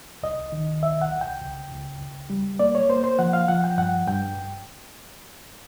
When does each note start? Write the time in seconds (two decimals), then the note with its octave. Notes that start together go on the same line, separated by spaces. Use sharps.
0.23 C2 D#5
0.52 D#3
0.82 C2 E5
1.02 F#5
1.12 C2
1.21 G5
1.41 C#2
1.71 C#2
2.00 C#2
2.30 G3
2.59 A#3 D5
2.75 C#5
2.89 A#3 C5
3.04 C5
3.19 F3 F#5
3.33 F5
3.48 F3 F#5
3.64 G5
3.78 G2 F#5
4.08 G2 G5